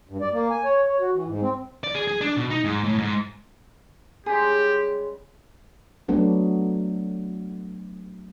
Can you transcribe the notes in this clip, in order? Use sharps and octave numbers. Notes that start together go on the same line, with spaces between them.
G2
D5
A#3
G#5
C#5
C#5
F#4
E3
G#2
C4
D5
G#4
G#4
D4
B2
D#4
G#2
A2
G#2
C#3 G3 G#3 G4 G#4
F#3 A3 B3 D4